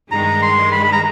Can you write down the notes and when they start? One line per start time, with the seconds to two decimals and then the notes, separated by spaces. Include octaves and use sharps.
0.11 G2 D#3 G#3 A#5
0.42 C6
0.72 B5
0.84 B5
0.92 A#5